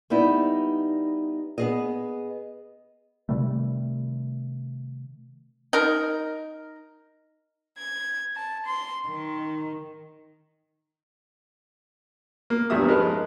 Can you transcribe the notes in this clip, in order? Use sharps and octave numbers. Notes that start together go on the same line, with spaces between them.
G3 B3 D#4 E4
B3 G#4 D#5
C3 D#3 G3 A3
D#4 A#4
G#6
A5
C6
D#3
A#3
A1 E2 G2 G3 E5 D#6
F3 G#3 D#4 A#4 B4